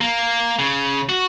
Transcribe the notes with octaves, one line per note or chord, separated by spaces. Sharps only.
A#3
C#3
F#4